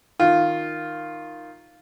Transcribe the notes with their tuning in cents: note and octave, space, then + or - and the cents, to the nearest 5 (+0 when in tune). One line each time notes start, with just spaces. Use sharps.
D#3 +0 F4 +0